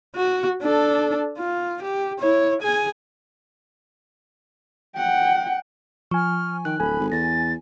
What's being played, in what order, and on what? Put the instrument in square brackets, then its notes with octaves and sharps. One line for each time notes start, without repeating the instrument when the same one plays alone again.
[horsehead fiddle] F#4
D4 A4
F4
G4
E4 C#5
G#4 G#5
F#5 G5
[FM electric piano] F3 G#5 [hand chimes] C#6 [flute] F6
[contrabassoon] D#3 [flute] G5 [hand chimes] F#6
[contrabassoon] D1 [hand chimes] A4 [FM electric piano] G#5 [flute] B5
[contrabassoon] G#1
[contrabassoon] E2 [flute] A6 [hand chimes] A#6